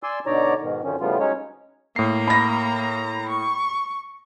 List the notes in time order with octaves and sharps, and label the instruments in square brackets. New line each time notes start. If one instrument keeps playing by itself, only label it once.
[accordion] D5 G#5 C6 E6
B2 D3 D#4 C#5 D5 A#5
G#2 B2 D#3
F#2 D3 D#3 F3 C#4
A2 C#3 F3 G3 B3 F4
F#3 G#3 C#4 D#4 C#5
[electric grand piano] A2 C7 [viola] A#3 A#5
[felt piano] B5 A#6
[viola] C#6